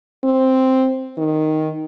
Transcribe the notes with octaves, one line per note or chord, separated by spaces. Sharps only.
C4
D#3